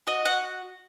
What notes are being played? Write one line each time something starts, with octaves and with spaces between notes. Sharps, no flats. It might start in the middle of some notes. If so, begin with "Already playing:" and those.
F#4 D#5
F#4 F#5